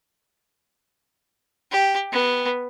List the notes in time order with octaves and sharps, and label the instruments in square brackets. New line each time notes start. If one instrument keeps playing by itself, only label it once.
[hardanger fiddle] G4
B3